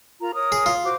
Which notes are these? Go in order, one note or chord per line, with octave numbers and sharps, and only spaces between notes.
F4 A#4 A#5
A#4 C#5 D#6
G#4
F4
F#4 C5 D6